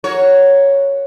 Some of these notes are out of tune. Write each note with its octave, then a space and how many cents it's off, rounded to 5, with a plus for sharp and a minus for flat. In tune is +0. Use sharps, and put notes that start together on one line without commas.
F#4 +0 A#4 +0 C#5 +0